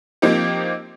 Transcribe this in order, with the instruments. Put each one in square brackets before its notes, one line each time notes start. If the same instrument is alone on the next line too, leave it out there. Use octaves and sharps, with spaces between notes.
[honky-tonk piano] F3 A#3 C4 D#4 G4